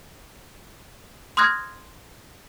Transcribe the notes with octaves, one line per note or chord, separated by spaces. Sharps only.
C6 D#6 F6 F#6 G#6 A#6